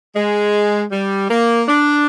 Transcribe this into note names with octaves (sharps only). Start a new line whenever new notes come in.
G#3
G3
A#3
D4